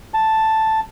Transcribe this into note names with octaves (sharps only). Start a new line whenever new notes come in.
A5